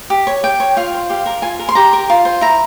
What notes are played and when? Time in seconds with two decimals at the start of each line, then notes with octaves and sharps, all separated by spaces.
0.10 G4
0.27 C#5
0.43 G4 G5
0.60 C#5
0.77 F4 F5
0.94 C5
1.10 G4 F5
1.26 A#4
1.42 F4 G#5
1.59 A#4
1.69 C6
1.75 G4 A#5
1.93 A#4
2.10 F4
2.25 C5
2.41 E4 A#5